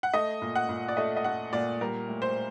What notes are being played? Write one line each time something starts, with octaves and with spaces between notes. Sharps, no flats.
F#5
A3 D#5
A#2
F#5
A#2
D5
A3 D#5
D#5
A3 F#5
A#2 D5
G3 A#4
A2
C5